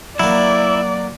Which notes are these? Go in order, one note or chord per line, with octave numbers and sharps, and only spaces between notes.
F#3 A#3 E4 D5